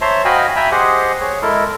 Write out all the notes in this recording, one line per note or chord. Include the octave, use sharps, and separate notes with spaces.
C5 C#5 E5 A5 A#5 C6
F#4 D#5 F5 G5 G#5 B5
E5 G5 G#5 A#5 B5
G4 G#4 C5 D#5 F#5
G#4 C#5
G#3 E4 A4 A#4